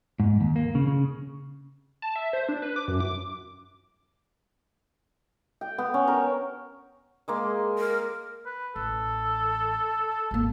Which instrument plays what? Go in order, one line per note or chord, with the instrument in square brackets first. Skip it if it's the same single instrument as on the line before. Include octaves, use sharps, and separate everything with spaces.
[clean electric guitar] G#2
D#2
A#3
C#3
C#3
[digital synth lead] A5
E5
C5
D4
B4
D6
F#2
D6
[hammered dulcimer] G5
B3
C#4
A#4
G#3 A#3 C6
[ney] A#4
[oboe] B4
[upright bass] A1 [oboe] A4
[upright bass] G#1 A#3